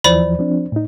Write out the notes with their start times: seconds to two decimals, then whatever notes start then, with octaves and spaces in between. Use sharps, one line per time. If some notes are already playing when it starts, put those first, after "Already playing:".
0.04 D#2 E3 F3 C5 D5 B5
0.39 F3 C4 D4
0.72 A2 D#4